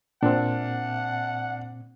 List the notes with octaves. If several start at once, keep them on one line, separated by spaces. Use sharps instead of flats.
A#2 C4 D4 F#5